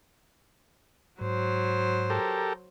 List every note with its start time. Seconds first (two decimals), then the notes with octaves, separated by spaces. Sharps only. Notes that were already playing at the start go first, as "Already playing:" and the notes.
1.21 G#2 F#3 C5
2.10 G4 A4 A#4